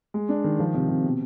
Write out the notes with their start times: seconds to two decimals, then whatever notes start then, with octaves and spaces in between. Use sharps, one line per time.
0.14 G#3
0.29 D4
0.44 D#3
0.59 F3
0.75 C3
0.89 C3
1.04 B2